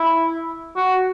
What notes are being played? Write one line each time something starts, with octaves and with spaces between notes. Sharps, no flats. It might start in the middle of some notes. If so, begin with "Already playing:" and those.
Already playing: E4
F#4